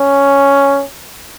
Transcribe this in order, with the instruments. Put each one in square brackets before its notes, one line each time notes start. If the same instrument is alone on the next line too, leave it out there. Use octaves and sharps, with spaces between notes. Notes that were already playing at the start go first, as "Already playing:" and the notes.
Already playing: [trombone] C#4